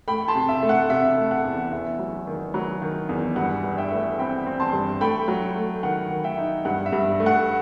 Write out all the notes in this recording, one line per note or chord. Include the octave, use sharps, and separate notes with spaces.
A3 G5 B5
A5 C6
C3
E5
A3
F#5
C3 E5
A3
F#5
E2
E2 E5
F#3
D#3
F#3
D#3
E2
G2 F#5
G2
E5 G5
A3
C4 G5 B5
C4
A5 C6
G2
A3 G5 B5
F#3
A3
D#3 F#5
D#3
E5 G5
D#4
G2 F#5
E5
G2
A3
F#5